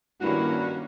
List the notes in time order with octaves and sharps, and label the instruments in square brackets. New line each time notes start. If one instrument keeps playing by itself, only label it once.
[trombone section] G2 [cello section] D#3 A#3 C#4 [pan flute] E4 [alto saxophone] F#4